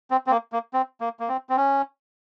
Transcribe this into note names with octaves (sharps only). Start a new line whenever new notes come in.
C4
C4
A#3
A#3
C4
A#3
A#3
C4
C4
C#4